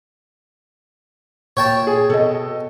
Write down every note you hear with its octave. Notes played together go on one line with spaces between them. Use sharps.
A#2 C#5 G5 A5
G#4
B2 A4 D#5